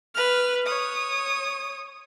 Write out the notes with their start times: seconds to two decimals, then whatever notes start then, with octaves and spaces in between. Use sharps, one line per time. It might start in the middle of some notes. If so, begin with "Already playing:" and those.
0.15 B4 F6
0.66 C#5 D#6